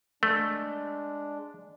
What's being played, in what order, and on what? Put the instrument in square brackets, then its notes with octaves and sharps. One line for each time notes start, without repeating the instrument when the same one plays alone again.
[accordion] G#3 D4 [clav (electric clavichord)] A3